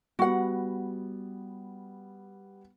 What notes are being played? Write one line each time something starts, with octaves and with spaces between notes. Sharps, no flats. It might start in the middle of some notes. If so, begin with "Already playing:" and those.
G3 B3 F#4 F#5